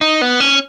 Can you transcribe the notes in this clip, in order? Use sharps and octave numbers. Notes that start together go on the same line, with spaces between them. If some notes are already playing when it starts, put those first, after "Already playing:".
D#4
B3
C#4